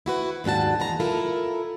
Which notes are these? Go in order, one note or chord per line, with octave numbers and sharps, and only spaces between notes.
E4 F#4 B4
D#2 G#2 D4 F#4 A5
E2 G#3 A#5
E4 F4 A4 A#4